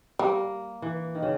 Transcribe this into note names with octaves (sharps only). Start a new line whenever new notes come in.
G3 A#3
E3
D#3
C#3